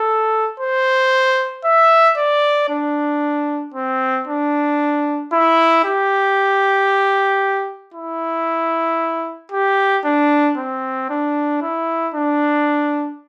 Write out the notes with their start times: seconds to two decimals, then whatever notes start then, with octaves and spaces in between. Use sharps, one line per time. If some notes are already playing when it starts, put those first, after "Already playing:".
Already playing: A4
0.60 C5
1.64 E5
2.17 D5
2.69 D4
3.74 C4
4.27 D4
5.33 E4
5.84 G4
7.94 E4
9.52 G4
10.05 D4
10.58 C4
11.10 D4
11.62 E4
12.14 D4